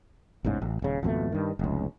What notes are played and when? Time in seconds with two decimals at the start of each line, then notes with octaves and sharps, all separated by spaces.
0.45 A1 E2 G#2 C#3
0.62 A1
0.82 D#1 C#3
1.03 G#1 F2 B2 A3
1.32 G2 D#3
1.59 F1 C#2